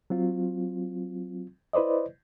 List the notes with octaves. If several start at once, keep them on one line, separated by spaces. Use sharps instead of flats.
F#3 C4 F4
E4 B4 C5 D5 D#5